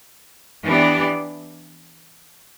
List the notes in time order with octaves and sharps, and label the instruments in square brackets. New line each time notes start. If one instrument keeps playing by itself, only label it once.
[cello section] E3 B3 D4 G4 D5